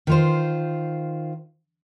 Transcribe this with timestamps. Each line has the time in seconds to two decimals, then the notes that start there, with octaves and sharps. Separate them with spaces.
0.07 D#3 F4 C5